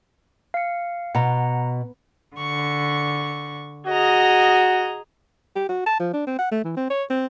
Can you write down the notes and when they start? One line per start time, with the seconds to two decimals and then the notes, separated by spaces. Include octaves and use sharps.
0.54 F5 C#7
1.15 B2 F#5 A#5
2.35 D3 C#6
3.87 F#4 G#4 D#5 A#5
5.56 G4
5.69 F#4
5.86 A5
6.00 F3
6.13 D4
6.27 C4
6.39 F#5
6.51 A3
6.64 E3
6.77 C4
6.90 C#5
7.10 C4